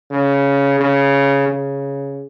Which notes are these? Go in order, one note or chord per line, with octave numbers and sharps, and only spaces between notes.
C#3
C#3
C#3